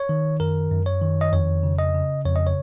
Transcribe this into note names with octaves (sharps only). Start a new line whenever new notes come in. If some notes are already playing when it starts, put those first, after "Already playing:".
Already playing: C#5
D#3
F#2 A#4
F#2
C#5
D#3
D#5
F2 C#5
C#3
D#5
C#3
F2 C#5
D#5
C#5